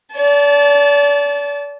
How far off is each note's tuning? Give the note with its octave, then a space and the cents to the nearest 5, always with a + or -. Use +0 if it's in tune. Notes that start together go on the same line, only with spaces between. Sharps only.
D5 -40 A5 -20